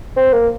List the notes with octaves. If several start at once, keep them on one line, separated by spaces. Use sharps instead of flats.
C4
A#3